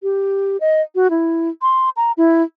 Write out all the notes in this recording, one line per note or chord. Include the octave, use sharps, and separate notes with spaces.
G4
D#5
F#4
E4
C6
A#5
E4